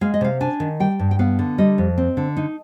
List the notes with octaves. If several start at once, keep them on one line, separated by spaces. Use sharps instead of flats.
G#3 F5
D#5
C3 F5
D4 G#5
D#3
G3 G5
G2
G5
B3 F5
D3
G3 D#5
F2
C4
D3
D#4